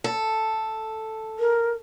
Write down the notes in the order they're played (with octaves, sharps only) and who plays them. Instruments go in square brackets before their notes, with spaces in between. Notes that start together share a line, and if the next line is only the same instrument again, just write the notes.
[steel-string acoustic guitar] A4
[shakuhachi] A#4